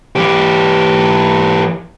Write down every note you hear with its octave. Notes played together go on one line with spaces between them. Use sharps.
E3 G4